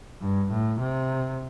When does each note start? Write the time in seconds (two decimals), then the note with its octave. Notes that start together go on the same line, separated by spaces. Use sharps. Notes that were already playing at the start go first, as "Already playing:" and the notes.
0.22 G2
0.51 A2
0.80 C3